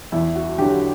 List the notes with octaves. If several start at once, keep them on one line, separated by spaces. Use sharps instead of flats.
E2 E4
F#4
D3 F#3 G4